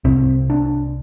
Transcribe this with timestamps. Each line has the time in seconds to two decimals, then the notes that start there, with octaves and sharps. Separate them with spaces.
0.04 C2 C3 C4
0.50 D4